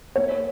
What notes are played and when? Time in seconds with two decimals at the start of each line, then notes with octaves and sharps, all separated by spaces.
0.16 A#3 C#5